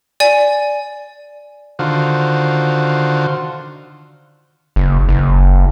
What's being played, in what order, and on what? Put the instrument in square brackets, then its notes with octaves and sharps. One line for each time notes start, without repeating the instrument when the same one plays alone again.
[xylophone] D5 G#5
[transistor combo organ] D3 D#3 F4 F#4 C5
[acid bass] F#1
F#1